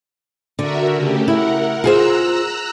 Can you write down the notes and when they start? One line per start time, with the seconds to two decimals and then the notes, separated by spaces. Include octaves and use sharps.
0.59 D3 F#4 A#4 E5
0.97 C#3 A3 G4
1.28 E4 A#4 F#5
1.84 F4 G#4 C5 A#5 E6 F#6